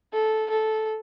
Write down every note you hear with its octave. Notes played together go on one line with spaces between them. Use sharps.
A4
A4